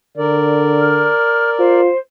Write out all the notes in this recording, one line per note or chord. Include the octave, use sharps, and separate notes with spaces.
D3 A#4 D5
F6
F4 C5